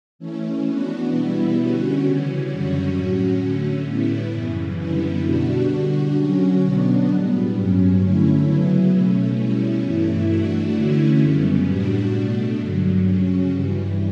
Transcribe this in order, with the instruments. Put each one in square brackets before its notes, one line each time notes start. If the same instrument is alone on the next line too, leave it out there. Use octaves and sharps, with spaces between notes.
[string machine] E3 A3 C#4
E3 B3 D4 F#4
B2 G3 B3 E4
D3 G3 C#4 F#4
C#3 E3 G3 C#4
F#2 D3 G3 C#4 F#4
A2 F#3 C#4 F#4
D3 A3 C#4
A2 G3 B3 E4
F#2 C#3 E3
F#2 D3 G3 B3 E4
B2 G3 D4 F#4
D3 G3 D4 F#4
D3 F#3 C#4 F#4
B2 F#3 B3 D4
A2 G3 B3
G2 F#3 C#4
D3 A3 C#4 E4
C#3 F#3 B3 E4
B2 A3 C#4
B2 G3 C#4 E4
G2 E3 A3 E4
E3 A3 D4 F#4
D3 A3 C#4 E4
F#2 C#3 G3 B3
A2 G3 D4 F#4
B2 A3 D4
G2 D3 F#3
C#3 F#3 C#4
G2 E3 G3